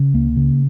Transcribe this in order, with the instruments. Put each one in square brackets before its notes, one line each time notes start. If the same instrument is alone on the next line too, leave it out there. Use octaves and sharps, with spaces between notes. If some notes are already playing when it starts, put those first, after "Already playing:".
Already playing: [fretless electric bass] C#3
C#2 A#3
C#3